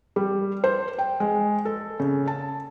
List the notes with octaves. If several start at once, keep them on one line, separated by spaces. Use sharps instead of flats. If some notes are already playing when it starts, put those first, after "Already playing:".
G3
C5
G5
G#3
A4
C#3
A5